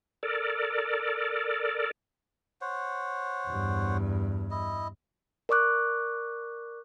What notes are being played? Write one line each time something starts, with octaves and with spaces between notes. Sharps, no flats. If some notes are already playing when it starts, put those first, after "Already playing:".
A4 A#4 D5
C5 C#5 F#5
E2 G2
E4 D#5
A#4 D5 C#6 D6 F#6